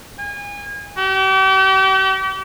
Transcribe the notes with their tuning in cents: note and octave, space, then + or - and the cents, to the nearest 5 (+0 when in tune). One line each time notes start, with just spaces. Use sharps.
G#5 -30
G4 -40